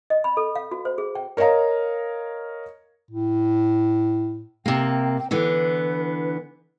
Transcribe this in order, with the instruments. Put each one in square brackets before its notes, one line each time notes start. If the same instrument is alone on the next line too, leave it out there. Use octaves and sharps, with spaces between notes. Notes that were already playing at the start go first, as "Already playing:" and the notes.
[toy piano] D#5
B5
A4
F5
F#4
C5
G#4
G5
[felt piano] A#4 C#5 D#5 F5 A#5
[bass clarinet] A2
[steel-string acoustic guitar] C3 A#3 [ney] G5
[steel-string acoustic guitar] D3 E3 B3 [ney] B4